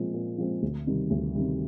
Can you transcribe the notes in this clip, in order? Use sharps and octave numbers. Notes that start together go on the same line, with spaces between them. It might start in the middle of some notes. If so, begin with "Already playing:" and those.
Already playing: A#2 F3 G#3 C4
A#2
F3 G#3 C4
D2
C3 D#3 G3
D2
C3 D#3 G3